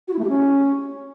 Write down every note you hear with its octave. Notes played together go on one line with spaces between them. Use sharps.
F#4
E4
A3
G4
C#4